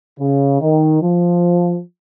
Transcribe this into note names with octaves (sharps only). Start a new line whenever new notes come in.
C#3
D#3
F3